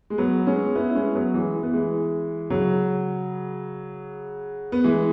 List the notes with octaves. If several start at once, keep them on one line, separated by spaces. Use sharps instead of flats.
G#3
F#3 B3
G#3 C#4
B3 E4
E4
G#3 C#4
F#3 B3
E3 G#3
B3
E3 G#3
C#3 F#3
B3
E3 G#3